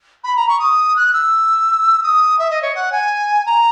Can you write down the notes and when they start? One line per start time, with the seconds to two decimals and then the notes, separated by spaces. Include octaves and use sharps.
0.24 B5
0.36 A#5
0.48 C#6
0.59 D#6
0.96 F#6
1.13 E6
2.03 D#6
2.39 E5
2.51 D#5
2.62 C#5
2.75 F#5
2.92 G#5
3.46 A#5